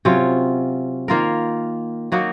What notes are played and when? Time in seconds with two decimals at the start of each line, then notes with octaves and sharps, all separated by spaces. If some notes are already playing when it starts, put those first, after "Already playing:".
0.05 C3 F#3 C#4 F4
1.08 D#3 A#3 F4 A#4
2.12 F#3 A#3 D#4 F#4